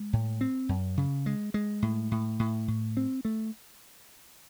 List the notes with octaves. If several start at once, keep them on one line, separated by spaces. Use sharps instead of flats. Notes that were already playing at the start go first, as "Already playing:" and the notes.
Already playing: G#3
A2
C4
F#2
C#3
G#3
G#3
A2
A2
A2
A2
C4
A3